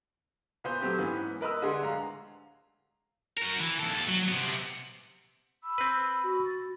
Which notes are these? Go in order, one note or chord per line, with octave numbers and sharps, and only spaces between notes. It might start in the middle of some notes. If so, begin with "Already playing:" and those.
A#2 B3 C5 G6
F#3 A3 C4 G4
G#2 E3 B3 C#4
A#4 B4 D#5 B5 E6
D3 G#3 G#4 F#5 C6
D1 F5 A#5
F#4 A#4
E3
D#2 A4
F#3
C3 B3
B5 E6
C4 B4
F#4
A6